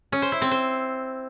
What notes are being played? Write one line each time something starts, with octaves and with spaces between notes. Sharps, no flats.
C#4
C5
E4
C4
C5